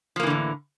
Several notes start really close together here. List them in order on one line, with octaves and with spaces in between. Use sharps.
F3 A#3 E3 D3 A2